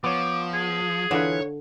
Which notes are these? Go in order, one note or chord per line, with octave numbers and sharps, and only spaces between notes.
F3 B3 C#5 D6
G#4
D3 E3 F4 B4 C#5